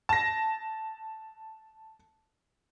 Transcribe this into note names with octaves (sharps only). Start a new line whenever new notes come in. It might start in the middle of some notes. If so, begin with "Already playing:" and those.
A5 A#6